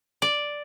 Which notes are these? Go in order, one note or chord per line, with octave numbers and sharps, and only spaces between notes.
D5